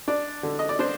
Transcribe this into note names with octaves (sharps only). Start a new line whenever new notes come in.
D4 D5
D3
D#5
D5
D4 C5